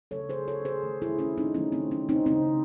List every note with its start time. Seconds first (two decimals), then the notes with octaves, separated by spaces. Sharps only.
0.11 C#3 F#3 A3 A4 C#5
0.29 G#4 C5
0.48 A4 C#5
0.65 G#4 C5
0.83 D#3 A3
1.02 E4 G#4
1.19 C#4 E4
1.38 C4 D#4
1.54 D#3 F#3 A3 C#4
1.72 C4
1.91 C#4
2.09 C4 D#4
2.26 C#3 G#3 C4 D#4